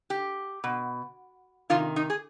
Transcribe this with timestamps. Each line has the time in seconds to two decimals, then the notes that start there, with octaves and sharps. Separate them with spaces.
0.10 G4
0.64 B2
1.70 C3 D#3 F4
1.96 D#4
2.10 G#4